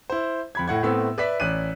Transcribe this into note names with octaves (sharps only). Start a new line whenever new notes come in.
E4 C5
F2 B5 G#6
A2 F#5 G#6
A2 A3 B3 C4 E6
B4 D5 E5 B6
A1 D5 F#6 D#7